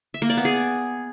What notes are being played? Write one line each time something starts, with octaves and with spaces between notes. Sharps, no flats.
E5
A#3
D5
B3
G#4